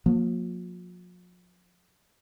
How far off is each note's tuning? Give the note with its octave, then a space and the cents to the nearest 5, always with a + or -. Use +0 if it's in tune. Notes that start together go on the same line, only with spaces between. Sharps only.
F3 +45 A#3 +0